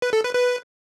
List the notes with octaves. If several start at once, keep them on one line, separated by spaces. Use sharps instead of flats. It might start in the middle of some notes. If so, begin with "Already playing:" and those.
B4
A4
B4
B4